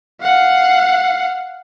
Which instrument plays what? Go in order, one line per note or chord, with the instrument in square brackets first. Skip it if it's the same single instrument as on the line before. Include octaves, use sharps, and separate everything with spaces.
[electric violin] F5 F#5